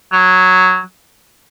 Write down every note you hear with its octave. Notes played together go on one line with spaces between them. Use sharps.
F#3